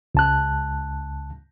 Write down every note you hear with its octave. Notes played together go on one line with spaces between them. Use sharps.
C#2 A5 F#6